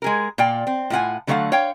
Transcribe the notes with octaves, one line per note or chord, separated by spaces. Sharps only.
G#3 G#4 A#4
A#2 F4 D5 G5
C4
A2 F4 F#5 G#5
D3 F#3 A3 C#5 F5 F#5
C#5 F5 G5